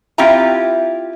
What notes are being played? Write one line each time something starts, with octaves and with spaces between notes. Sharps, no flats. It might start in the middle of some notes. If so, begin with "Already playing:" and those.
C4 E4 F4 G4 E5 A#5